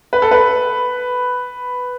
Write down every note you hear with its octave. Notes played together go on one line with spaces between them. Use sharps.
B4
A4
B4